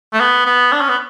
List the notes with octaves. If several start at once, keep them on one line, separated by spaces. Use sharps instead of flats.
A3
B3
B3
D4
C#4
B3